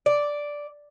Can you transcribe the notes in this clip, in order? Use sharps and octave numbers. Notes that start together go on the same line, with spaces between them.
D5